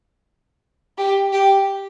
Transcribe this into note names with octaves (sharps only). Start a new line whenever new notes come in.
G4
G4